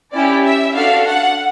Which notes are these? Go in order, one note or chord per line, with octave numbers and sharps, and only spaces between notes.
C#4 E4 G4 D5
E5
D4 F#4 A4 F5
F#5